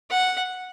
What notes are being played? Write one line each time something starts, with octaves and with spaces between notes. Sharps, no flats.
F#5